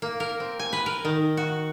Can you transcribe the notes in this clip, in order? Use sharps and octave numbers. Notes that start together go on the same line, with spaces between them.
A#3
A#4
C4
G#5
B4
A#4
D#3
F#4